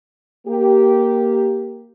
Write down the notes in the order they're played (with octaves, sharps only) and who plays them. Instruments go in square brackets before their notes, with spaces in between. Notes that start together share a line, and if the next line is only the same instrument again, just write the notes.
[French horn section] A#3 G4